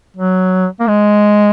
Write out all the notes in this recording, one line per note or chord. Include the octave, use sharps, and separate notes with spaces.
F#3
A#3
G#3